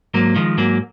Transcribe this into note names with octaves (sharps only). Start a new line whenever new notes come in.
G#2 F#3 A#3
D#3 F3 G#3
G#2 F#3 A#3